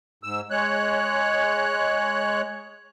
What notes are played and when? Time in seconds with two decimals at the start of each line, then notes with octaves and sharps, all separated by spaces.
0.23 G#2 E6
0.51 G#3 C#5 F#6